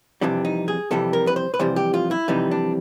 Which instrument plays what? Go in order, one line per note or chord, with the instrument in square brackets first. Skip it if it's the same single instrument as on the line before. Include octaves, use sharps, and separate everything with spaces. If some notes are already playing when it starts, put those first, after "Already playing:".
[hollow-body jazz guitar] F2 C3 E3 G3 D4
D#4
G#4
F2 C3 E3 G3 A4
A#4
B4
C5
B4
F2 C3 E3 G3 C5
G4
F4
E4
F2 C3 E3 G3 D#4
D4